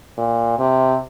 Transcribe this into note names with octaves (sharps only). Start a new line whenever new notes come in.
A#2
C3